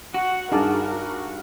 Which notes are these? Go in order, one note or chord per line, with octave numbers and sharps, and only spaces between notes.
F#4 F#5
G2 D#4 G#4 A#4 F#5 A5 D6